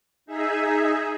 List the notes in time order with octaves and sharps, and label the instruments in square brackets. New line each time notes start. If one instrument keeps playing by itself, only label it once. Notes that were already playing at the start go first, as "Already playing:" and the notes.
[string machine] D#4 G#4 E5